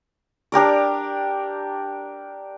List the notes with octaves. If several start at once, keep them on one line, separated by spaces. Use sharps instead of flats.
D4 G4 A#4 D5